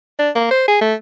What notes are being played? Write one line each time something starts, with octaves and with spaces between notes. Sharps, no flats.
D4
A#3
C5
G#4
A3